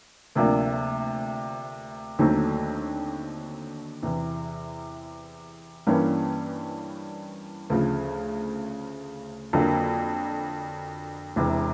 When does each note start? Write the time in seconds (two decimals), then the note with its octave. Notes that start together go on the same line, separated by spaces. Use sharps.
0.35 D2 C3 F3 A#3 D4
2.19 D#2 D3 F#3 A3 C4
4.03 E2 C3 E3
5.87 G2 E3 G3 A#3 C#4
7.70 D2 C#3 F3
9.53 F2 D3 F#3 A#3
11.36 E1 E2 C3